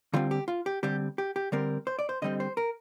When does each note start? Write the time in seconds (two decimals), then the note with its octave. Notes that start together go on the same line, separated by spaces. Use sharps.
0.13 D3 G3 C4 F4
0.31 G4
0.48 F4
0.66 G4
0.83 D3 G3 C4 G4
1.18 G4
1.36 G4
1.52 D3 G3 C4 A#4
1.87 C5
1.99 D5
2.09 C5
2.22 D3 G3 C4 D#5
2.40 C5
2.57 A#4